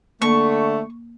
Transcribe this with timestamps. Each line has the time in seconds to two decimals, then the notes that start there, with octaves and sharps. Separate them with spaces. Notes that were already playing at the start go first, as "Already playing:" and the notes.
0.22 D3 A3 A#3 C#6